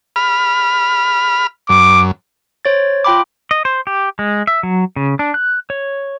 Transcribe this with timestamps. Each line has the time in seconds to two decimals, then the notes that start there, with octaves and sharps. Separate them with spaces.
0.16 B5 F6
1.69 F#2 D6
2.65 C5 C#5 A6
3.04 F4 G5 B5 D6
3.51 D#5
3.65 C5
3.87 G4
4.19 G#3
4.47 E5
4.63 F#3
4.96 C#3
5.19 D4
5.34 F#6
5.70 C#5